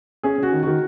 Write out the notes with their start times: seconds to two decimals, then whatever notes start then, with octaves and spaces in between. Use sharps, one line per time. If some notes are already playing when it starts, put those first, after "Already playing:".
0.23 C#4 G#4
0.38 C#4 F#4
0.53 D#3
0.63 D#3 F#4